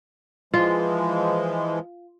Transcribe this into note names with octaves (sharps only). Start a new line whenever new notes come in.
E3 F3 G#3 F4